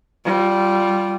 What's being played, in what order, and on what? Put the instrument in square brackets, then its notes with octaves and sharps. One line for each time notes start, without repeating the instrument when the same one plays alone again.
[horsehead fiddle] G3 F4